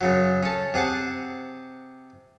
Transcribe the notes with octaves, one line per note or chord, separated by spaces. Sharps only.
F#2 C#3 F#3
C#4 A4
C3 G#4 F#5 A5